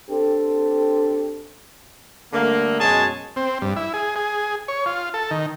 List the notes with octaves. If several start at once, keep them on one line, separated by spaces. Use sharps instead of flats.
C4 D4 G4 A4
D3 G3 A3 A#3
F#2 B2 G#3 G#4 C#5 A5
C4
G2
E4
G#4
G#4
C#5
F4
A4
D#3